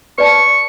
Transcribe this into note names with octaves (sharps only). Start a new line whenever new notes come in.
B4 D5 A5 C#6